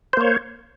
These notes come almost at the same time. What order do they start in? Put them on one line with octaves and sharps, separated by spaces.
C5 A#3 C#5